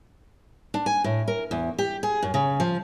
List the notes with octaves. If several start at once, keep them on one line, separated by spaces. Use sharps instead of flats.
D4
G#5
A2
A#4
E2
G4
G#4
F#2
C#3
F3